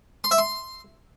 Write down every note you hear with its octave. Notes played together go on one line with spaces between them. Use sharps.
C6
E5
C6